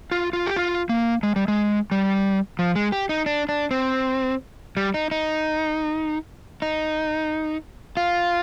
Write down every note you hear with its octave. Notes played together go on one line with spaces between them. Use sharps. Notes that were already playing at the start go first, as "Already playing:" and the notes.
F4
F4
G4
F4
A#3
G#3
G3
G#3
G3
F3
G#3
G4
D#4
D4
D4
C4
G3
D#4
D#4
D#4
F4